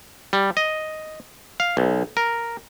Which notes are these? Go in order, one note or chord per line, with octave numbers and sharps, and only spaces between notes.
G3
D#5
F5
B1
A#4